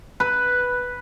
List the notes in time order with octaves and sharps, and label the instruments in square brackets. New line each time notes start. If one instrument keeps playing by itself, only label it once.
[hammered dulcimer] B4